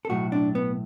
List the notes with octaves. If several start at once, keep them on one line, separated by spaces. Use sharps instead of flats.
A4
B1 A2 F#3 F#4
D4
B3